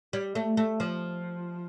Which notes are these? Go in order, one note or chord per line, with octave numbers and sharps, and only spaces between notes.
G3
A3
A3
F3